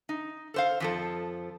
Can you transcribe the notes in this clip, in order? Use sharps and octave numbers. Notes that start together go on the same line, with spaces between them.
D#4
A4 C5 F5
F2 F3 A4